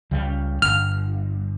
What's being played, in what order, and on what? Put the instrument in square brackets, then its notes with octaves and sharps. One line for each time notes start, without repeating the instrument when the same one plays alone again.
[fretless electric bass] C#2 C#3 G3
[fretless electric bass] G1 [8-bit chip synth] F6